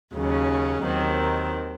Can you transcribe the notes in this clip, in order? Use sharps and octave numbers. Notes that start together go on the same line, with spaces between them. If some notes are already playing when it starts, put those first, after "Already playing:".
D#2 C#3 F#3 C#4
D#2 D#3 F#3 C4